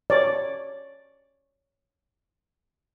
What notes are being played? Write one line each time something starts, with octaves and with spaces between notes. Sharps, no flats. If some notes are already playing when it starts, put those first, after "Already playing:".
C#5 D5